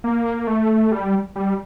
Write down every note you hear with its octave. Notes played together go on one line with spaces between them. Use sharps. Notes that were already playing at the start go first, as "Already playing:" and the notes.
A#3
A3
G3
G3